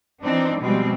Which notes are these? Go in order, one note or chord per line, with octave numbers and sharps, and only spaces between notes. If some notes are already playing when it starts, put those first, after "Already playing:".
E3 C4 D4 D#4
B2 F3 G3 G#3 C4